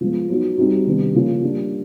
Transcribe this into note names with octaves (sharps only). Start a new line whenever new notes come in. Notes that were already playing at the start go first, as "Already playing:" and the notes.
F3 G#3 B3
F#3 B3 D#4 F#4
G3 C4 D#4 F#4
C3 D#3 G3 B3 D4
C#3 F3 A#3 C#4 F4
G3 A#3 D4